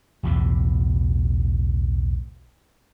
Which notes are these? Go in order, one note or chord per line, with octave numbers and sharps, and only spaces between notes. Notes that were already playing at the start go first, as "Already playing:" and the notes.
B1 E2 A2 C3